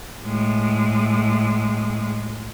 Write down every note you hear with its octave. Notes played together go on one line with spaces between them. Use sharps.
A2 G#3